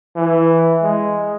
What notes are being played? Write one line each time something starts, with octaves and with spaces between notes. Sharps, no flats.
E3
G#3